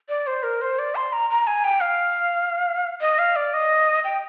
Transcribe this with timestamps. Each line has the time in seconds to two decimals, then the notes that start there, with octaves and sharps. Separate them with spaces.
0.09 D5
0.27 C5
0.43 A#4
0.61 C5
0.79 D5
0.96 C6
1.13 A#5
1.30 A#5
1.47 G#5
1.64 G5
1.81 F5
3.01 D#5
3.19 F5
3.36 D5
3.53 D#5
4.04 G5